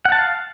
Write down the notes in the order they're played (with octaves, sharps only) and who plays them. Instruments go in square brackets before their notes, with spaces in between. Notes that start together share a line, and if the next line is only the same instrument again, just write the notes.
[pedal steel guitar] F#5
A5
F5